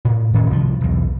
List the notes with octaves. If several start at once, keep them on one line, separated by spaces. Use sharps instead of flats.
A2
D1 D#3 C#4
C2 F3
B1 E2